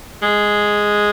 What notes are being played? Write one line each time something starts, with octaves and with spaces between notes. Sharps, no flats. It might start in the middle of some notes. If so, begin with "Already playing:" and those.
G#3